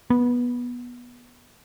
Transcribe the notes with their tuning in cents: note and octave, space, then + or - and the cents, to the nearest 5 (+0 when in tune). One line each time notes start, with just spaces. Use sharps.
B3 -15